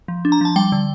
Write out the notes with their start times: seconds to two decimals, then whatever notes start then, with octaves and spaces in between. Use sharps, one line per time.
0.08 F3
0.25 D4
0.32 A#5
0.41 F3 A5
0.56 G3 G5
0.72 D3